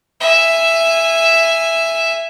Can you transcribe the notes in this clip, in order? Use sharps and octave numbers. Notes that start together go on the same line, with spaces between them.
E5 G#5